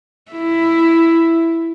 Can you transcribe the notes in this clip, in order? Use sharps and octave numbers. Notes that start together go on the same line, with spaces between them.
E4